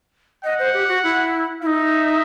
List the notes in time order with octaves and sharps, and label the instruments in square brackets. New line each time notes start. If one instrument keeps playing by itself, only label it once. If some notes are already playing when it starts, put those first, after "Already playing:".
[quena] D#5 [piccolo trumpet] F#5
[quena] C5
G4
F#4
E4
[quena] E4 [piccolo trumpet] E5
[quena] D#4